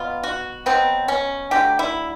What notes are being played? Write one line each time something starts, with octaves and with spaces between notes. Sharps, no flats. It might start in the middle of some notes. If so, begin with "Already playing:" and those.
Already playing: B2 F#3 B3 F4
F#4
B2 F#3 B3 C4
C#4
D3 F#3 A3 G4
E4